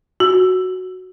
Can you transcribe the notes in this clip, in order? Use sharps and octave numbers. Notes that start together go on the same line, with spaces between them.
F#4